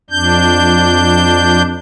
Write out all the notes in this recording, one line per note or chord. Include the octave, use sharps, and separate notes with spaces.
F2 D4 G6